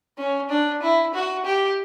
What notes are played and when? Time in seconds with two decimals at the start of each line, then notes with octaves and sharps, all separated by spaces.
0.18 C#4
0.49 D4
0.82 E4
1.14 F#4
1.45 G4